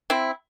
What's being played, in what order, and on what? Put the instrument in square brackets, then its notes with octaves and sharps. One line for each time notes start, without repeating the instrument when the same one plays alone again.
[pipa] C4 E4